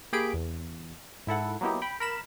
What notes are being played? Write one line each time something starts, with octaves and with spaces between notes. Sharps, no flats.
A#3 G4 G#4 B5 D7
E2
G#2 E4 A4 F#5
F#3 A#3 B3 D#4 E4 G4
G5 B5
A#4 B5 E7